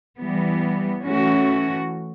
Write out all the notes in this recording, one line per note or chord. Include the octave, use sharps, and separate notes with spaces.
E3 G3 B3
E3 A3 C#4 F#4